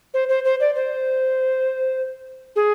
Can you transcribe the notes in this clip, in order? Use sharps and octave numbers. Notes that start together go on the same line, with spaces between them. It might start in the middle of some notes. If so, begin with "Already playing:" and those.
C5
C5
C5
D5
C5
G#4